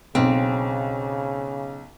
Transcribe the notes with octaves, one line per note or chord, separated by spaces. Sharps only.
B1 C#3 C4